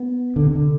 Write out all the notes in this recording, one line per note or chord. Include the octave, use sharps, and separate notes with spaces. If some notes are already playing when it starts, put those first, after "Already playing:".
Already playing: B3
D3
C3
D3